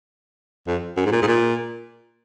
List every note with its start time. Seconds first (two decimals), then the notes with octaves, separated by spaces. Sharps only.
0.67 F2
0.97 F#2
1.05 G#2
1.12 A#2
1.22 G#2
1.27 A#2